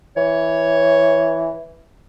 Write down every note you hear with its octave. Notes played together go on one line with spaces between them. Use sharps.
E3 C#5